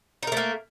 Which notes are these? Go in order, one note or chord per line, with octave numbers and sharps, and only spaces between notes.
A3 A#3 D#4 A#4